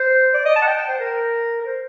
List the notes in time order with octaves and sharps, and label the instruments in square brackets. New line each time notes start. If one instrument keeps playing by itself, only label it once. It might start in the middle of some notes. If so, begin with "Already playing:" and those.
Already playing: [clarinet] C5
D5
D#5
A5
F#5
G5
G5
C5
A#4
A#4
C5